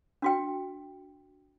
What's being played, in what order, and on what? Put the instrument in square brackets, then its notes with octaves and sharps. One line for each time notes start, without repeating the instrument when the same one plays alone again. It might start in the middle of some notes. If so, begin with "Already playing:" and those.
[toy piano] D4 F#4 G5